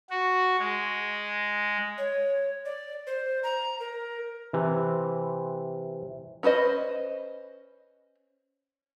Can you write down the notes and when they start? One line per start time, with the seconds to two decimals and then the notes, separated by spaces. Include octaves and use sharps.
0.10 F#4
0.58 G#3
1.98 C#5
2.65 D5
3.07 C5
3.43 A#5
3.80 A#4
4.53 C3 E3
6.43 C#4 B4 C5 D#5